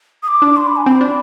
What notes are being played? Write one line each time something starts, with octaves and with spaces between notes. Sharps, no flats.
D#6
D6
D4
C6
B5
G#5
C4 B5
D4